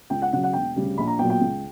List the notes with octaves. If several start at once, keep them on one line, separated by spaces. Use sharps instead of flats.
C#2 G5
F#5
C#3 F#3 F#5
F#5
E1 G5
D2 C#3 G3
A#1 B5
A#5
A#2 F#3 B3 G5
G5
C#2